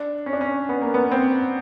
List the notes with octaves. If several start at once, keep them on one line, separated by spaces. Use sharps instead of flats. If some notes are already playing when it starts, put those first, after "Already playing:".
Already playing: D4
C#4
D4
C#4
B3
A#3
B3
C4